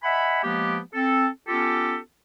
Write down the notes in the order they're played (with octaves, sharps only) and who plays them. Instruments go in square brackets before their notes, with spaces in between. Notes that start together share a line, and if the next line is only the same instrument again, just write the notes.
[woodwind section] D#5 E5 F#5 G#5 B5
F3 G#3 A#3 B3 G4
C4 A4
B3 C#4 F4 G4 A4